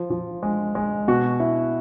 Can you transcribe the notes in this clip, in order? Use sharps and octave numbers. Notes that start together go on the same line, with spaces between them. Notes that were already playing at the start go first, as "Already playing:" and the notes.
Already playing: F3
F3
G#3
G#3
B2 F#4
E4